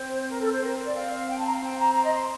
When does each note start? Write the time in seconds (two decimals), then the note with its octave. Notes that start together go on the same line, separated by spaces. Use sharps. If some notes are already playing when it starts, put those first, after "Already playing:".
Already playing: C4 C5
0.29 A#4
0.40 A4
0.51 C5
0.63 C4 A#4
0.84 D5
0.95 C4 F5
1.29 G5
1.37 A5
1.46 A#5
1.54 F5
1.62 C4 G5
1.79 A#5
1.95 A#5
2.04 D#5
2.13 C6
2.21 A#5